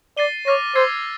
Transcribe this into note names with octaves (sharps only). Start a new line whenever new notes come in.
D5 A6 C7 D#7 G7
C#5 D6 F6 A#6 D#7
C5 E6 G#6 C7